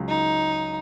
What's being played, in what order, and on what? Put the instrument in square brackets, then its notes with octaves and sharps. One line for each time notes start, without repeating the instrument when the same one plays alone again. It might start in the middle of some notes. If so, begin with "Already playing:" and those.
Already playing: [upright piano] C#2 C#3 F#3
[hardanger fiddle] D#4